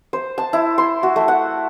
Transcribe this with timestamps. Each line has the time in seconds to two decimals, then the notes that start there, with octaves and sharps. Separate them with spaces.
0.13 C5
0.38 A5
0.53 E4
0.78 C6
1.03 F#4
1.16 A3
1.28 F#5